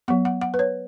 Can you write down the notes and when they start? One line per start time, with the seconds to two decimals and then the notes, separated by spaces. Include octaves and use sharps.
0.08 F#3 B3 F#5
0.25 F#5
0.41 F#5
0.54 B4
0.59 C#5